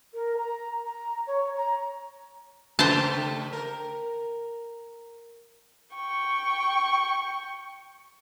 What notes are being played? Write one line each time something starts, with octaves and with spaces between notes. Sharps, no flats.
A#4
A#5
A#5
C#5
A#5
C#3 A3 G4 C5 A5
A#4
G5 C#6